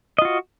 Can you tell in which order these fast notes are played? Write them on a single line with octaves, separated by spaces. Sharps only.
D#5 F4 F#4